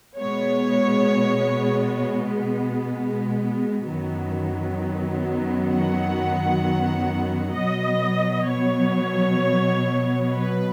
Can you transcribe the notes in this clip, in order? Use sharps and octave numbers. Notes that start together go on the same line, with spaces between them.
B2 G#3 B3 C#5
F#2 D#3 F#3 B3
F#5
B2 F#3 B3 D#5
C#5
B4